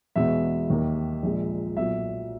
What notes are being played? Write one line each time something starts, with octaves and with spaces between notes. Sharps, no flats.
E2 B2 G#3 B3 E5
D#2 D#3 A#3
A#1 A#2 G#3
B1 A#2 F#3 E5